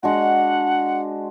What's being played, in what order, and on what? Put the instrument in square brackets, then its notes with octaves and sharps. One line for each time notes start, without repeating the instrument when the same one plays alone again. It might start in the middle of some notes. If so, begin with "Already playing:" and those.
[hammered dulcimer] G#3 D4 F#4 [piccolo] F#5